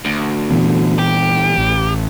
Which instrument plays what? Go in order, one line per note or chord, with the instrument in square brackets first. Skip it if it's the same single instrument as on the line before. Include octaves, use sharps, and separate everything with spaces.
[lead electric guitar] D2
[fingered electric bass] A#2 E3 B3
[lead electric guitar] G4
[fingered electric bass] A1